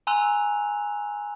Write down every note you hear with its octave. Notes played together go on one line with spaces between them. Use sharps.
G#5 A#5 C6 E6 F#6 F7